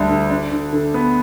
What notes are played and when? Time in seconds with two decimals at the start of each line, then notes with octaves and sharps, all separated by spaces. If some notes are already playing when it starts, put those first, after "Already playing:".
Already playing: D2 G3 D4
0.09 D3
0.30 D4
0.52 D3
0.73 D3
0.94 B3